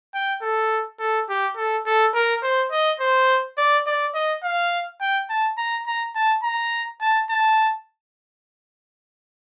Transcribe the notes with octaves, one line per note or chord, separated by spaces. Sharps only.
G5
A4
A4
G4
A4
A4
A#4
C5
D#5
C5
D5
D5
D#5
F5
G5
A5
A#5
A#5
A5
A#5
A5
A5